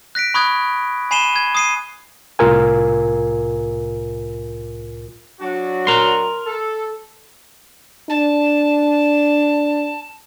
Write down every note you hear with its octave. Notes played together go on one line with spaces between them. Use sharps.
F#6 A#6 B6 D7
B5 C#6 D#6 F#6 G#6
G#5 B5 C7 D#7 E7 G7
G#6
D#6 C7 D#7
C2 A2 F4 A#4 G#5
F#3 D4 F#4
A#4 C6
A4
D4 A5